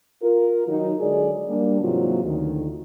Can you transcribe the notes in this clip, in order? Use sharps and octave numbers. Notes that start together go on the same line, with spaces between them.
F4 A#4
D#3 F#3 D#4
D3 F#3 G#3 G#4 C#5 D5
G3 A#3 D4
G#2 C3 E3 F#3 A#3 F4
D2 D#3